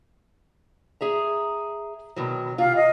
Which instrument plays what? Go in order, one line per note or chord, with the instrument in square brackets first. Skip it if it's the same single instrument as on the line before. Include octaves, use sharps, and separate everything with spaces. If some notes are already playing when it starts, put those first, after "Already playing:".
[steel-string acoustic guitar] G#4 E5 A#5
B2 D#3 F#3
[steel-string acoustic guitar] C3 F4 [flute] F5
[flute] D#5